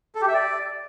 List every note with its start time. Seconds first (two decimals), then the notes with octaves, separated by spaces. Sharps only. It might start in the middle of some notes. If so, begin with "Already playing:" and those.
0.15 A4
0.21 G4
0.28 E5
0.34 D5